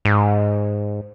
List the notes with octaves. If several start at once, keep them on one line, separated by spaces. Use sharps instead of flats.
G#2